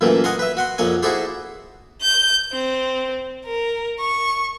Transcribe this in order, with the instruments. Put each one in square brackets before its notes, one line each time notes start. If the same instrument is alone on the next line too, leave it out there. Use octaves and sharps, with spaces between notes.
[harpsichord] F#2 A#2 E3 A3 A#3
D#5 F#5 G#5 A#5 C6
B4 E5
F#4 F#5 C6
A#1 F2 A#3 C#5 G#5
E4 F#4 G#4 A4 C5 D5
[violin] G6
C4
A#4
C#6